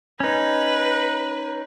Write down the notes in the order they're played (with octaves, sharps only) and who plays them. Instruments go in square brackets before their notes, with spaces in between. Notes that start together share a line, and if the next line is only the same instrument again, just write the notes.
[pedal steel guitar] C#4 D#4 [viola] B4